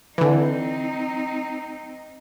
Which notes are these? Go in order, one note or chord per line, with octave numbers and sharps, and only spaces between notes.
D3 E3 C4 D#4